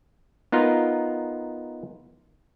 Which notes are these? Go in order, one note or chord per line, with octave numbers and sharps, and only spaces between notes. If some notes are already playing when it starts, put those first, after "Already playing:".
B3 D#4 F4 A#4